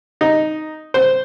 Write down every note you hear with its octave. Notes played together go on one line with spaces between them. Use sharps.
D#4
C5